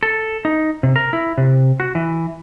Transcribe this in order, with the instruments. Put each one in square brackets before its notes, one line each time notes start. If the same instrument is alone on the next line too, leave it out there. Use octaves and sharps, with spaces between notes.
[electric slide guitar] A4
D#4
C3
A#4
E4
C3
F#4
E3